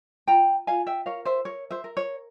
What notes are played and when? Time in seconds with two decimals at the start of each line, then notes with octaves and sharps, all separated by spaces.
0.27 F4 G5 A#5
0.67 F4 F5 G#5
0.87 E5 G5
1.06 A#4 C#5 F5
1.25 C5 E5
1.45 A#4 C#5
1.71 C5 E5
1.84 A#4
1.97 C#5